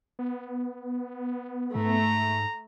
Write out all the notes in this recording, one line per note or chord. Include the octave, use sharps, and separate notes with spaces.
B3
G#2 A3 A#5